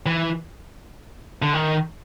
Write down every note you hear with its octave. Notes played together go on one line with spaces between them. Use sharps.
E3
D3
D#3